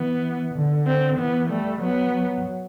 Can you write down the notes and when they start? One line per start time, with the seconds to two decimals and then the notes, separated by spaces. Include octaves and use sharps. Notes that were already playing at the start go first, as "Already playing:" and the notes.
Already playing: E3 B3
0.55 D3
0.87 C4
1.18 E3 B3
1.50 G3 A3
1.82 F#3 B3
2.15 F#3